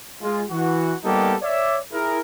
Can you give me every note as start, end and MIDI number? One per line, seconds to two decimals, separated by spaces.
0.21 0.42 56
0.21 0.42 65
0.50 0.93 52
0.50 0.93 66
1.04 1.34 55
1.04 1.34 58
1.04 1.34 59
1.04 1.34 63
1.04 1.34 67
1.04 1.34 69
1.42 1.78 73
1.42 1.78 74
1.42 1.78 76
1.92 2.19 64
1.92 2.19 68
1.92 2.19 70